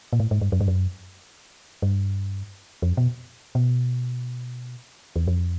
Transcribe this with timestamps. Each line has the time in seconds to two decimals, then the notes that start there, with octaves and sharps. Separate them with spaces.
0.13 A#2
0.20 A2
0.31 G#2
0.41 G2
0.52 F#2
0.61 G2
0.68 F#2
1.82 G2
2.82 F2
2.97 B2
3.55 B2
5.16 E2
5.28 F2